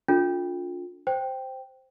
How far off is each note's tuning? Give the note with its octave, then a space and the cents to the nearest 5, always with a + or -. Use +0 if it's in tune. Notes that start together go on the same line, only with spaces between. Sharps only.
D4 -30 F4 +25 A4 -5
C5 +0 G5 +0